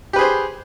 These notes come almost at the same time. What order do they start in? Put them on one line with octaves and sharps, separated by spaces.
G4 B4 G#4 C5